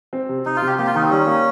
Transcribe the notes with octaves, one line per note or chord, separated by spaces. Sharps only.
C4
C3
C3 D#4
F4
C3 G4
A#3 G4
F4
D#3 D#4
C4
G3 C#4
A#3